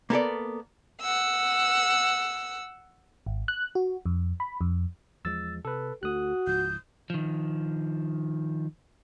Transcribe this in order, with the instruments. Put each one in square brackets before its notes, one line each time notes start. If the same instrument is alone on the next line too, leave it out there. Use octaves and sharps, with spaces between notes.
[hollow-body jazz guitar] A#3 B3 A4 D5
[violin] F#5 E6
[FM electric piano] G#1
F#6
F#4
F2
B5
F2
[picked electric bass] E2 F3 G#3 [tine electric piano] E6 A6
[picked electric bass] C3 [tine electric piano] A4 B4
[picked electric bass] D2 A3 [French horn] F#4 [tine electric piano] D#6 F#6
[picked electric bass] C#2 G#2 F3 [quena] G6
[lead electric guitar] D#3 F3